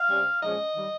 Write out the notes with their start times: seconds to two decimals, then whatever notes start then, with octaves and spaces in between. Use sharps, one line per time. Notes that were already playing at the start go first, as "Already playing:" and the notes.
Already playing: F5
0.10 C3 G3 C#4
0.42 A#2 F3 G#3 C#4 D#5
0.75 D#3 G3